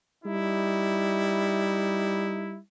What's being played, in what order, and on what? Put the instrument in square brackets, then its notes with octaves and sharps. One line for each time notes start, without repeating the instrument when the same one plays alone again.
[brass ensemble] G3 D#4 E4